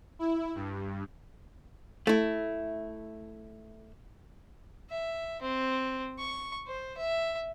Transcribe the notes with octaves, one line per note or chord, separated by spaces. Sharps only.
E4
G2
A3 E4
E5
C4
C#6
C5
E5